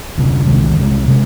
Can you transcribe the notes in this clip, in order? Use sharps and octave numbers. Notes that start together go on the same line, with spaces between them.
D2 C3 G3 D4
C2 C3 D#3 G#3
C2 C3 D#3 G#3
C3 D#3 G#3